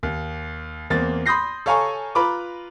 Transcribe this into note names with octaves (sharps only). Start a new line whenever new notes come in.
D#2
E2 A#3 C4 A6
B5 C6 D#6 G6 A#6 C7
A4 C#5 F5 G#5 A#5 C#6
F4 B4 A#5 B5 D6